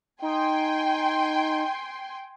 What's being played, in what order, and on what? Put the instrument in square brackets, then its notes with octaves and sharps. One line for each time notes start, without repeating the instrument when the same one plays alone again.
[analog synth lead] D#4 [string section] G5 G#5 C6